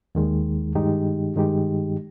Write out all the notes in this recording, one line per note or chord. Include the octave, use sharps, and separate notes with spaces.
D#2 D#3 G#3
G2 D#3 G#3 D#4 G4
G2 D#3 G#3 D#4 G4